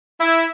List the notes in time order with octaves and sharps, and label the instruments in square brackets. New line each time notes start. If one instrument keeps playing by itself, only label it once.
[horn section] E4